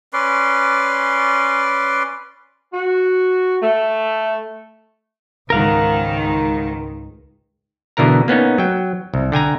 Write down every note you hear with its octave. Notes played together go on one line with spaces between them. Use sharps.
C#4 B4 D5 C6
F#4
A3
C#2 G#2 D#3 A#4 F5 F#5
B2 D3 E3 A#4 A#5
A#3 B3 C#4 D#4
F#3 G5
C2
D3 G5 G#5 A#5